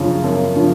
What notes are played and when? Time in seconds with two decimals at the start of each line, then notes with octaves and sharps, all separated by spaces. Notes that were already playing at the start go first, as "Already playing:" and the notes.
Already playing: F#2 C#3 F3
0.24 F#2
0.56 C#3 F3